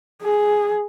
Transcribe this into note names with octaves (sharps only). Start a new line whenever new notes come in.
G#4